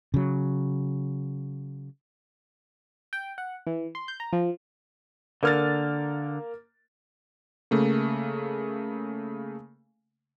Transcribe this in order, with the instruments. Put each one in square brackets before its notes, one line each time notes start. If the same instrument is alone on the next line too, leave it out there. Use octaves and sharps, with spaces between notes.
[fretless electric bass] C#3 F#3
[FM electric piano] G5
F#5
E3
C6
G6
A#5
F3
[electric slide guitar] D3 [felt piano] A#3 F6 A6
[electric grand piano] C#3 A3 A#3